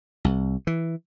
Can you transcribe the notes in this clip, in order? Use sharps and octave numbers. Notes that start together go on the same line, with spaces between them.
C2
E3